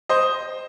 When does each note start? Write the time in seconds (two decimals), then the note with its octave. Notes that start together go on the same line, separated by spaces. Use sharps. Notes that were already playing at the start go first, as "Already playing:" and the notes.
0.09 C5 D#5